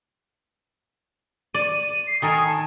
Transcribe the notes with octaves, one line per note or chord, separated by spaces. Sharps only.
D5 D#7
C7
D#3 A4 A#4 G#5 D#6
A5